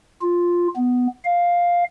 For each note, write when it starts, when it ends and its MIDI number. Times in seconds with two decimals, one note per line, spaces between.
0.22 0.68 65
0.76 1.07 59
1.25 1.84 77